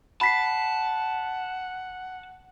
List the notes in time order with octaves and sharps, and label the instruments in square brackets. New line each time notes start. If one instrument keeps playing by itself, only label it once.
[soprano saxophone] F#5 [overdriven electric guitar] A5 [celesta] B5 B6 C7